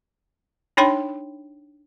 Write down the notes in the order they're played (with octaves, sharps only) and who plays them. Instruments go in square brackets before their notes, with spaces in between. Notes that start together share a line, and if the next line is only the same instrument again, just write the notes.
[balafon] D4 D#4 C#5 G5 B5 C6